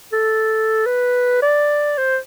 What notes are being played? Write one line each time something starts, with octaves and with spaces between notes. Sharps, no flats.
A4
B4
D5
C5